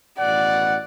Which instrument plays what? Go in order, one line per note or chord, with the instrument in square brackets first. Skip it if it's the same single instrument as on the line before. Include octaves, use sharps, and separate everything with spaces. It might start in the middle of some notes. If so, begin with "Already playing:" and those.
[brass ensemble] A1 B2 F#5 [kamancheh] D5